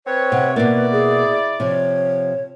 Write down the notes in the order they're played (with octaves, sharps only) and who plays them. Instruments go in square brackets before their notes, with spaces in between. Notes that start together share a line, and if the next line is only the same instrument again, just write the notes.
[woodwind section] C4 B4 C#5
[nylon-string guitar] C3 [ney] F#5
[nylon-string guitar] B2 A#3 [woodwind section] E4 D5 [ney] B4
[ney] G#4
[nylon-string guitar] C3 F3 [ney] C#5